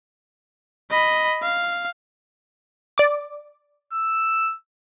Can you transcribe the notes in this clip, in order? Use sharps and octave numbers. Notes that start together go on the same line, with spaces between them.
D#5 B5
F5
D5 D6
E6